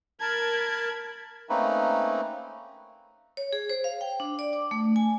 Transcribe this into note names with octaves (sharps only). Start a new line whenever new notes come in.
A#4 A5 B5 G#6
A3 A#3 C4 C#4 D#4 B4
C#5
G#4
C5
F5
G5
D4
D5
D6
A3
G#5